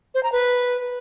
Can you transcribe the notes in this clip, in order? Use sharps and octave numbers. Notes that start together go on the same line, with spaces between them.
C5
A#5
B4